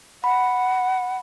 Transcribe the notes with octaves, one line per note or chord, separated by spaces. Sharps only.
F#5 B5